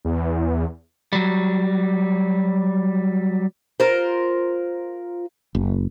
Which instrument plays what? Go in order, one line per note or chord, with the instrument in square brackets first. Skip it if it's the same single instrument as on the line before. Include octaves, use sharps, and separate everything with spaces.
[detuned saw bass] E2
[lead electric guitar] F#3 G3
[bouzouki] F4 A#4 C5
[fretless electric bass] F#1